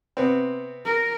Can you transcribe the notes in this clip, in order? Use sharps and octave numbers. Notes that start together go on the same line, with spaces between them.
C3 B3 C4
A#4